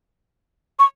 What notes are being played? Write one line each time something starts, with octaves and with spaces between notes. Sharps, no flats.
C#6